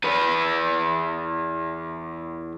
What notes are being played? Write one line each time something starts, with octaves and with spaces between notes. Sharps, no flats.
E2 B4